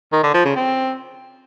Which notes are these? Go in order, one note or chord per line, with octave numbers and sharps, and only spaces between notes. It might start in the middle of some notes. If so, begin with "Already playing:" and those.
D#3
D3
F3
C#3
C4